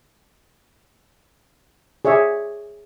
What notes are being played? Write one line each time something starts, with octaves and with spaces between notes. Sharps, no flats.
G#4 C#5 D5 E5